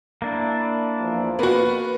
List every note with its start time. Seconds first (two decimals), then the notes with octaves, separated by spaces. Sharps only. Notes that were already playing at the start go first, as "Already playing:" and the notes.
0.22 A#3 D4 E4
1.00 E2 F3
1.39 A#3 B3 F#4 B4